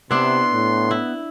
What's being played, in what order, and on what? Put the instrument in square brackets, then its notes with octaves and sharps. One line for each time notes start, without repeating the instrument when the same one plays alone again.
[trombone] C3 [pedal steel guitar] B3 [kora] D4 E4 [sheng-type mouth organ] C6
[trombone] A2
[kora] E4